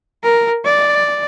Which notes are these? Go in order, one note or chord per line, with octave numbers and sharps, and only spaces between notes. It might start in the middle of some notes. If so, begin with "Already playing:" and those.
A#4
D5